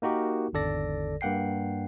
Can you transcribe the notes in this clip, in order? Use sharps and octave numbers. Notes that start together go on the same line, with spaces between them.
A#3 D#4 F#4 G4 A#4
G#1 E2 D3 A4 D5 A#6
G2 A#3 F#5 G5 C7